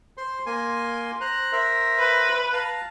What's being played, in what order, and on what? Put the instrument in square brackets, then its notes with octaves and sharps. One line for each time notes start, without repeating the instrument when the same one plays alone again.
[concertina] C5 C6
A#3 G#5 C6
C5 A#5 F#6
A#4 C5 E5
[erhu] B4
[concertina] F5 A5 A#5